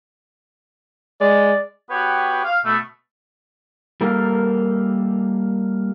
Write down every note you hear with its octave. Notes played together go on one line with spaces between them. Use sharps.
G#3 D5
B3 F#4 G4 B4 C#5 G5
F5
B2 A3
G3 A#3 A4 A#4